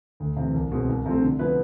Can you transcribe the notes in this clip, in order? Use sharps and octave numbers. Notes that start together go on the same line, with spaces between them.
D2
C3 E3
C2
B2 G#3 C4
C2
C3 F3 A3 C4
D3
F3 B3 E4 B4